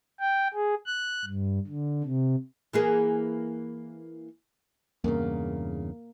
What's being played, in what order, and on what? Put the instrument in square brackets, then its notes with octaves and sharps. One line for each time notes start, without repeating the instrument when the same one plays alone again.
[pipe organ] G5
G#4
F#6
G2
D3
C3
[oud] E3 A#3 G#4
[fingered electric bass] E2 G2 C#3 [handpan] A#3 A#4